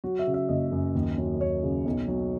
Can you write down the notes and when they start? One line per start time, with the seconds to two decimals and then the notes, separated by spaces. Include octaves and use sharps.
0.04 F#3 F#4
0.19 E5
0.27 C#3
0.34 E5
0.49 F#1 D#5
0.72 F#2
0.95 D#2
1.18 F#3
1.40 D#2 C#5
1.64 C#3
1.86 B1
2.08 F#3